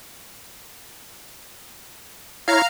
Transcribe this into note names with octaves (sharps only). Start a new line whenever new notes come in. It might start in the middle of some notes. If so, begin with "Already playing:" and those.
E4 C#5 F5 A#5 F6